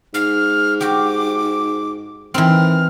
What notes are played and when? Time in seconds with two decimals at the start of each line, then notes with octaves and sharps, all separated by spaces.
0.14 G#2 F6
0.81 F#4 G4 D6
2.34 D#3 E3 C4 F6